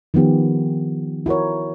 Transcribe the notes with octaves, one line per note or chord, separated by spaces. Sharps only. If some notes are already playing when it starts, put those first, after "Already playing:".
D#3 F3 B3 G4
E4 F#4 A#4 C#5